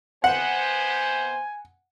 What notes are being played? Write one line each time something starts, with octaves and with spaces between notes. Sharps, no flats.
C3 B3 C5 F#5 G#5